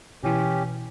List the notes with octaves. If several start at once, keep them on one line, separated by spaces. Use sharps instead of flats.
B2 E3 C#4 G4